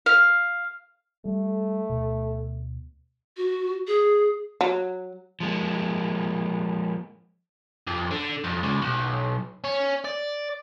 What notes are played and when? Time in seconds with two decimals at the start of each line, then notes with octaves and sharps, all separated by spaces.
0.06 F5
1.25 G3 A3
1.90 D2 B2
3.37 F#4
3.87 G#4
4.61 F#3
5.40 F3 G#3 A#3
7.87 F2
8.11 D3
8.44 F2
8.63 C#2
8.82 B1
9.64 C#4
10.05 D5